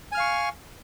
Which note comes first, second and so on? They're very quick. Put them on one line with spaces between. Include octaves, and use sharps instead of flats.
G#5 F6 F5 C#6